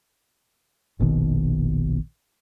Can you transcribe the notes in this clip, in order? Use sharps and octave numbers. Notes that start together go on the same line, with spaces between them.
F1 A#1 B2 D#3